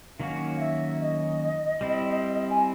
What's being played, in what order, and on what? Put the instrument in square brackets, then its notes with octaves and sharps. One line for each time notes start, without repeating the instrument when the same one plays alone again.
[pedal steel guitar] D#3 F#3 A#3 C#4 F#4 [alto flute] F5
[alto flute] E5
D#5
[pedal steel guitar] G3 C4 E4
[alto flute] G#5